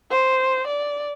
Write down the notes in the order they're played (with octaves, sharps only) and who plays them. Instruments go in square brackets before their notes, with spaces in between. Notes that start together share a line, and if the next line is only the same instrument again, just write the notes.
[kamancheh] C5
D5